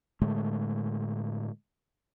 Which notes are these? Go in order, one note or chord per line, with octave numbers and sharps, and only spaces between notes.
A2 D3 G#3 A3